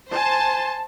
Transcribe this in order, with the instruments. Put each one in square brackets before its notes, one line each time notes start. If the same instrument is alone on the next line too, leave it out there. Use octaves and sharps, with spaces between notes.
[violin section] C5 A5 [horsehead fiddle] G#5